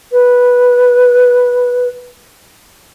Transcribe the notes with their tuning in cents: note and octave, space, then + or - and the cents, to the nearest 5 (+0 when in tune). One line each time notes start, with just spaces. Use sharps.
B4 -5